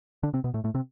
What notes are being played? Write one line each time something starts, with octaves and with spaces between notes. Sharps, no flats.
D3 D4
C3 C4
B2 B3
A2 A3
A2 A3
C3 C4